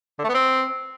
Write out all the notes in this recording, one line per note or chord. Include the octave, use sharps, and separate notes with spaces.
D3
A3
B3
C4